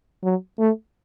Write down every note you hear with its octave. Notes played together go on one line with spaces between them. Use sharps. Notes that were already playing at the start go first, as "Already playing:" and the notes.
F#3
A3